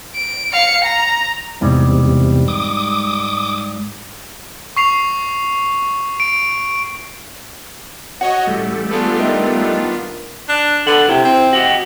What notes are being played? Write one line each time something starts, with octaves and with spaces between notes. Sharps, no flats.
D7
F5 C#7
A#5
E2 G#2 C3 G3
D6 D#6
C#6 C7 F7
D7
F#4 C#5 D#5 F#5
A1 G3 A3
B3 D4 F4 F#4 G#4 A4
D#3 A#4 D#5 E5
D4
D3 A4 B4 F#5
C3 E4 G5
C4
F#4 G4 D#5